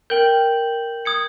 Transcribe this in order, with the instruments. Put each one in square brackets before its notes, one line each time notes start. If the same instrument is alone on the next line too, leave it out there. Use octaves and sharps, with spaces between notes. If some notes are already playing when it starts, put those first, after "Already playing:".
[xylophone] A#4 G5 [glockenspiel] G6 F#7
[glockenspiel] D#6 G#6 C#7